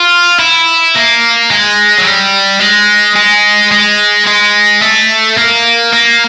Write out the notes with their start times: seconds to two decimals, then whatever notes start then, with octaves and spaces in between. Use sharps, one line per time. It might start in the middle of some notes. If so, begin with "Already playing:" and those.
Already playing: F4
0.39 E4
0.95 A#3
1.51 G#3
1.98 F#3
2.05 G3
2.60 G#3
3.16 G#3
3.71 G#3
4.27 G#3
4.82 A3
5.37 A#3
5.93 A#3